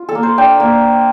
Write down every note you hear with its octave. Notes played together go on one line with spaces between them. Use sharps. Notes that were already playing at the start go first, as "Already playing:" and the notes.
Already playing: F4
A4
A#3
C5
D4 G5
A#3